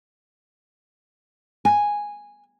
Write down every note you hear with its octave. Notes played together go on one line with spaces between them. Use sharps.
G#5